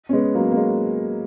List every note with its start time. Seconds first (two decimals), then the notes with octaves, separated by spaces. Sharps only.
0.09 C#4
0.13 G#3 B3
0.35 F#3 A#3
0.51 A#3
0.56 G#3